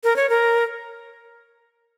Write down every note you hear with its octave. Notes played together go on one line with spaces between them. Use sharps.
A#4
C#5
A#4